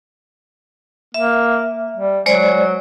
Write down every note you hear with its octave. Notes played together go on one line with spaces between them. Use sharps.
A#3 E5
G3
F#3 G#3 C5 D5